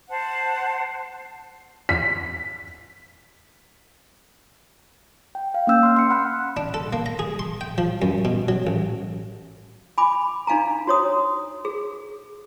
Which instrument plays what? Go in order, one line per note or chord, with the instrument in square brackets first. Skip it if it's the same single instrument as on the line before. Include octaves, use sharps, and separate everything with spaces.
[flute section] C5 F#5 A5
[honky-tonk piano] B6
[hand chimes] G5
F5
A#3 C#4 E6 G6
C6 F6
C6 C#7
F#5 B5 F#6
[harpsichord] D4
A4
A#3
A#5
G#4
C6
G5
F3
F#2
B2
F#3
A1
[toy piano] G#5 B5 D6
D4 D#4 F5 G#5 A#5
F#4 C#5 D#6
G#4